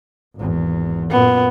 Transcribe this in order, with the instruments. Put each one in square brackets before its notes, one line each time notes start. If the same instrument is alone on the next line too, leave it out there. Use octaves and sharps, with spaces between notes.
[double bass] G#1 E2
[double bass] F#2 A#2 [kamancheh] B3